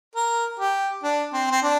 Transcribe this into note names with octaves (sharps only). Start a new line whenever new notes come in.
A#4
G4
D4
C4
C4
D4